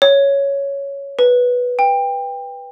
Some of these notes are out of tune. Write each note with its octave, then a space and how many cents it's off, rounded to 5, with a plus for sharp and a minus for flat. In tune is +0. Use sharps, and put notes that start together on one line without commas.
C#5 +5
B4 -5
G5 +20